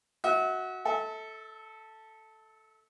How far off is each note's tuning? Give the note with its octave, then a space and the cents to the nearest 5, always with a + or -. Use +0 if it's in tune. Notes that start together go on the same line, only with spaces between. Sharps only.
F#4 +0 E5 -40
A4 +0 E5 -35